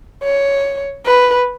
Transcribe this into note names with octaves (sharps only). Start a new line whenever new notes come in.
C#5
B4